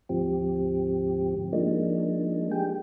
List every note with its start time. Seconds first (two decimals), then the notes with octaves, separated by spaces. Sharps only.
0.09 D2 G#2 F3 C4 G4
1.53 F3 G#3 A#3 D4 D#4
2.51 G4 G#4 G5